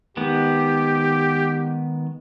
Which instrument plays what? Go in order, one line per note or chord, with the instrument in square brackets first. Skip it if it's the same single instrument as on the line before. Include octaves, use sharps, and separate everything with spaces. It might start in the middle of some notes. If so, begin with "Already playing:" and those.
[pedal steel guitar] D#3 G#3 B3 [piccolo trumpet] G4